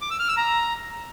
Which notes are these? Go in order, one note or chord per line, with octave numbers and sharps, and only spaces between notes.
D6
E6
F6
E6
A#5